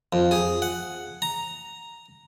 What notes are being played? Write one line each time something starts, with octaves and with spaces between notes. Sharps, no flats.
F2
G#4
F#5
A#5